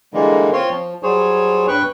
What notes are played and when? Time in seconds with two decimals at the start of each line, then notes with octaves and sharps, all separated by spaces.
0.14 D3 E3 G3 G#3 A#3
0.53 C4 F4 C#5 C6
0.70 F3
1.03 F#3 G3 G#4 C5 C#5
1.68 G2 B4 G5 C#6 F#6